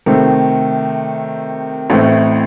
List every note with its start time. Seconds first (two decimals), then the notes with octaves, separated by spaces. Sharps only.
0.06 C3 D#3 A3 C4
1.90 A1 A2 A3 C4